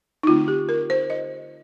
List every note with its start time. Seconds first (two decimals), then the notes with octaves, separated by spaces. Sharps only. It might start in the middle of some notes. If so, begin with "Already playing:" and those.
0.23 D#4
0.27 D3 A3 C4 F4
0.48 G4
0.69 A#4
0.90 C5
1.10 D#5